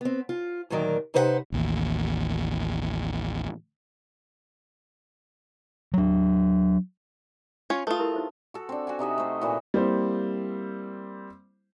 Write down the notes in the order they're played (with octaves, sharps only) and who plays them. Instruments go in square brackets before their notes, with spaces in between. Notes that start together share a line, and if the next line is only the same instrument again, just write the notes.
[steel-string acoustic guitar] B3 C4
F4
D2 A#2 D#3 F#3 A#4 D5
C3 D#4 B4 C5 D5 F#5
[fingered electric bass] A1 D#2
F#3 D4
[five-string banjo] C#4 F4 C#5
[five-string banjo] A3 F4 [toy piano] A4 B4 D#6
[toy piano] E4 G4 A#4
D#4 C5 E5
[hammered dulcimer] F#4 A4
C4 D4
F#4 F#5 G#5
C3 D#4 D#5 E5
A3 C5
A#2 E3 D#4 F#4
[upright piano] G3 A#3 C4 E4 C5